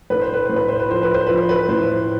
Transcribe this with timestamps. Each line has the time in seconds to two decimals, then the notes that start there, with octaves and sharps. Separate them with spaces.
0.10 A2 B4
0.22 C5
0.34 B4
0.46 A2 C5
0.56 B4
0.68 C5
0.80 B4
0.90 F3 C5
1.03 B4
1.14 C5
1.27 F3 B4
1.38 C5
1.49 B4
1.69 A2 C5